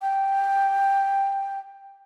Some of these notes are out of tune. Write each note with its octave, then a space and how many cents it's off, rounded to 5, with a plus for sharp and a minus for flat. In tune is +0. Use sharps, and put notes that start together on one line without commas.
G5 +5